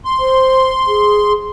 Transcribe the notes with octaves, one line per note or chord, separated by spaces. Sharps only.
C6
C5
G#4